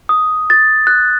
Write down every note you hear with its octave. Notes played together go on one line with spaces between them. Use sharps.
D#6
A6
F#6